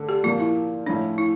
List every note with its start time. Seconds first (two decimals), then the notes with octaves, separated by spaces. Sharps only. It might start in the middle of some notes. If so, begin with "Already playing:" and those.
Already playing: D3 A3
0.09 G4
0.24 A#2 F3 A#3 F4
0.40 E4
0.86 A2 F3 C#4 D4 E4
1.18 E4